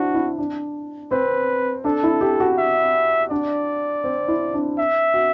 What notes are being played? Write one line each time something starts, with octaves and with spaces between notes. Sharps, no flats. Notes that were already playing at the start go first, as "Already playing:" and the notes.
Already playing: C4 D4 E4 F#4
E4
D4
C4 B4
D4 A4
E4
G4
F#4
E5
D4 D5
C4
E4
D4
E5
F#4